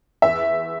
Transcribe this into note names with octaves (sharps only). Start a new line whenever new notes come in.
E2 E5